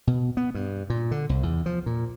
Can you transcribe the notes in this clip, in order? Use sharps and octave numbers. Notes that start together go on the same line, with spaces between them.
B2
B3
G2
A#2
D3
C2
E2
F3
A#2